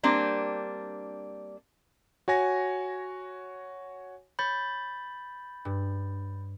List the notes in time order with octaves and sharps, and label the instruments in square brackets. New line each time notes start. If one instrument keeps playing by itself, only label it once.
[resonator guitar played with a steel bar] G3 A#3 C4 D4
[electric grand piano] F#4 C#5 G#5 A#6
[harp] C#5 [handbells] B5 G6 A6
[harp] G2